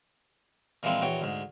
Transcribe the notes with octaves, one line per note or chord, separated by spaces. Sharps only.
A#2 E3 F3 G#3 A#3 C4
A#1 E3 F#4 C#5 G5
D2 G#2